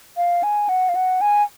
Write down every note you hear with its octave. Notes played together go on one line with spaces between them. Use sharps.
F5
G#5
F#5
F5
F#5
G#5